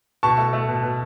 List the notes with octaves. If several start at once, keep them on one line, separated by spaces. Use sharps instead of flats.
B2 A5 C#6
A3
A3
B2
B2